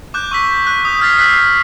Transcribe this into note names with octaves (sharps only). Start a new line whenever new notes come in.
D6 F#6 G6
C#6 E6 B6
F#6
D#6 G6
D#6 F6 G#6 A6 B6 C7
E6 F#6 B6 C7